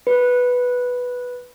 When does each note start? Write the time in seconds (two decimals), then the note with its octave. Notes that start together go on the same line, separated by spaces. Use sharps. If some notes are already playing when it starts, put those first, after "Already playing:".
0.07 B4